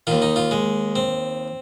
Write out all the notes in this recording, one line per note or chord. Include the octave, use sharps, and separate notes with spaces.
D#2 D#3 F4
D#4
F4
G#3
C4